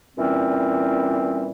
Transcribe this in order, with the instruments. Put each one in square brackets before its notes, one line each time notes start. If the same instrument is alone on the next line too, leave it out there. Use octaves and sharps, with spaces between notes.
[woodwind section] A#2 E3 G3 C4 C#4